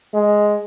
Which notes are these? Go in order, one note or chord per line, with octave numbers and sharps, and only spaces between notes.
G#3